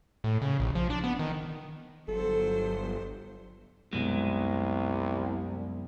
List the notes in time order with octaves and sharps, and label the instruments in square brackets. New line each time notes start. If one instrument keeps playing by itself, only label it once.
[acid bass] A2
C#3
A#1
F3
D4
B3
D#3
[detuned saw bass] G1 [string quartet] F#3 C5 [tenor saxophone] A4
[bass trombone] C2 [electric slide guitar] F#2 B2 G#3